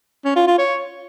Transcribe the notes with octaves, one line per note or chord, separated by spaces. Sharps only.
C#4
F4
F4
C#5